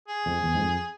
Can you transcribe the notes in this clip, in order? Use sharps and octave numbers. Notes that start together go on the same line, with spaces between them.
G#4
F2
E2
G#2
F2